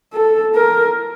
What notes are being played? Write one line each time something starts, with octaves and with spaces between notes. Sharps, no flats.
A4
A#4